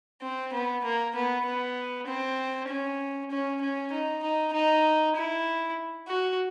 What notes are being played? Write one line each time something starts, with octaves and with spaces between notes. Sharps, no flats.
C4
B3
A#3
B3
B3
C4
C#4
C#4
C#4
D#4
D#4
D#4
E4
F#4